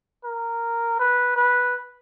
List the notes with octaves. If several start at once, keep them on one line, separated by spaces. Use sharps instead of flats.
A#4
B4
B4